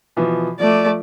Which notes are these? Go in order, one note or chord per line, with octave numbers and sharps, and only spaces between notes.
B2 E3 F3
F3 A3 D5 D6